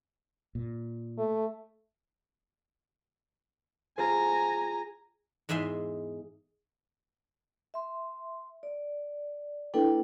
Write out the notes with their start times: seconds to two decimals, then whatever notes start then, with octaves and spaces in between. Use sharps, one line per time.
0.55 A#2
1.18 A3
3.98 F4 G#4 C5 G#5 A#5
5.49 E2 G#2 G#3 E5 C6
7.74 E5 C6
8.63 D5
9.74 A#3 D4 E4 A4 B4 G5